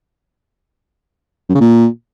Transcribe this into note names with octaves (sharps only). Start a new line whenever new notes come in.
F#2
C#3
A#2